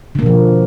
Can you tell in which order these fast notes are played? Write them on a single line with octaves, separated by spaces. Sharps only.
D3 A#3 B2 F3